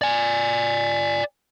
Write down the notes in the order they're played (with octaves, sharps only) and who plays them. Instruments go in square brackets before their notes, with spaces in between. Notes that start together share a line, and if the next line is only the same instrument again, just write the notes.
[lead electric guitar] D5 G#5